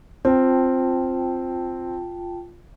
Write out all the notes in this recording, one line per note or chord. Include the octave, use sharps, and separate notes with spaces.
C4 F4 G5 A5